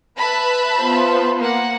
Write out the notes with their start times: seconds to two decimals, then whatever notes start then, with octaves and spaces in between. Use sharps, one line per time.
0.18 B4 E5 A5 B5
0.77 B3 F4 C5
1.39 A#3 F#5